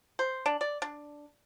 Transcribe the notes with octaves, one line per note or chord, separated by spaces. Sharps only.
C5
D4
D5
D4